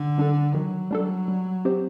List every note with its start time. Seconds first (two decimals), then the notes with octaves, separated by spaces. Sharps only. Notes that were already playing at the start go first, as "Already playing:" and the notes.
Already playing: D3
0.18 G3 D4 A4
0.55 D#3 F#3
0.91 G3 D4 A4
1.28 G3
1.65 C4 G4 C5